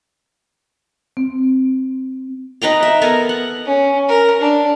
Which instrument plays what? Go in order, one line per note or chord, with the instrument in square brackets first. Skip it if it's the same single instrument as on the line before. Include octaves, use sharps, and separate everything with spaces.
[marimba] C4
[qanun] D#4 B4 G5 A#5
E5
B3 A4 A#4 G#5
F#5
[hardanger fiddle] C#4
A#4
D4